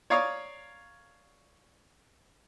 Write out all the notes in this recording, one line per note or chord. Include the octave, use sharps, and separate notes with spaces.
C#5 D5 F5 A#5 C#6 D#6